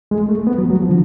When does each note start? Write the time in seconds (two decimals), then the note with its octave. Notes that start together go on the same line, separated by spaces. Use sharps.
0.11 G#3
0.29 A3
0.47 B3
0.58 F#3
0.70 F#3
0.82 F3
0.89 D3